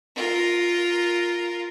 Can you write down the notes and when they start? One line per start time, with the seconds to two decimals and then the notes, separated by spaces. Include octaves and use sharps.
0.16 F4 A#4